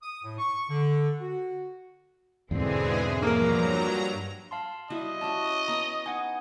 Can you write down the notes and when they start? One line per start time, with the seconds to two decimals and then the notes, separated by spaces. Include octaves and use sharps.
0.03 D#6
0.23 A2
0.38 C#6
0.69 D3
1.21 F#4
2.51 E2 G#2 B2 D3 E3 G#3 C4 G#4
3.23 G2 F3 F#3 A#3 A#4 A#5
4.51 F5 A5 C6
4.90 G3 E4 F#4 D#5
5.21 C#4 F#4 A5
5.68 B3 A#5
6.06 D#4 F#5 G#5